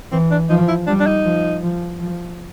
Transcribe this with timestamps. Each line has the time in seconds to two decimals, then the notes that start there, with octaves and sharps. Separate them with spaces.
0.12 E3 C4
0.31 D4
0.50 F3 D#4
0.68 E4
0.87 G3 D4
1.00 D4
1.07 D#4
1.25 F3
1.63 F3
2.00 F3